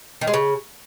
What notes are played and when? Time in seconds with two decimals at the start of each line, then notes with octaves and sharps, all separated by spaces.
0.21 D#3
0.27 G#3
0.34 C#3